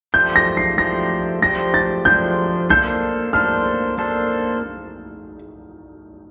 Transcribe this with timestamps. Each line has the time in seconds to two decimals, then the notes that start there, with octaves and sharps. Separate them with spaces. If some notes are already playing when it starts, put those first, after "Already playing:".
0.14 F3 A3 D4 G4 C5 G6
0.36 A#6
0.57 C7
0.78 F3 A3 D4 G4 C5 A#6
1.42 F3 A3 D4 G4 C5 A#6
1.74 A6
2.05 F3 A3 D4 G4 C5 G6
2.70 A#3 D4 A4 C5 G6
3.33 A#3 D4 A4 C5 F6
3.98 A#3 D4 A4 C5